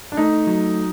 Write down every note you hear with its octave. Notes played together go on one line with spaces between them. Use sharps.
D4
A3 D#4
F#3